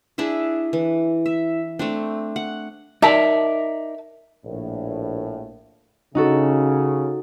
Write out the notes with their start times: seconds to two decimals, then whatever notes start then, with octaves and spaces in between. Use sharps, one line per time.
0.18 D4 E4 G#4 E5
0.73 E3
1.26 E5
1.79 A3 C4 D4
2.36 F#5
3.02 D#4 A#4 D5 E5 A5
4.45 A#1 A2
6.15 C#3 D#4 F#4 A4